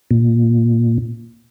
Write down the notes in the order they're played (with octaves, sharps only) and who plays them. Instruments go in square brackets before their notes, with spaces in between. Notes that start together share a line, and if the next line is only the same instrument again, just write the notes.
[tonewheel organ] A#2